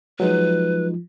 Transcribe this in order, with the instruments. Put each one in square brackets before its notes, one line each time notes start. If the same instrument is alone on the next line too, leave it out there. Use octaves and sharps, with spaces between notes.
[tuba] F3 [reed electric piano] F#3 G#3 D#4 [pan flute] B4